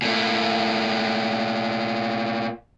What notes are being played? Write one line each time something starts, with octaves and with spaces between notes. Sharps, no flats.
A#2 A3